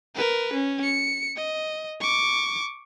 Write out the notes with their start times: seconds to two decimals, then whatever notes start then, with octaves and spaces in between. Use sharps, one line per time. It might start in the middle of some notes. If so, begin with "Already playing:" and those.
0.15 A#4 B4
0.54 C#4
0.83 C#7
1.36 D#5
2.00 C#6 D6